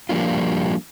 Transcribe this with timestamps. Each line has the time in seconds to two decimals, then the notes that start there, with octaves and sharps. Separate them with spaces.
0.09 F3 G3 A#3 D4 F4